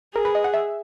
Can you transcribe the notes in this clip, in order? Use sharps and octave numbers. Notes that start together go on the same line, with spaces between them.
G#4 A#4
B4
D#5
F#5
E5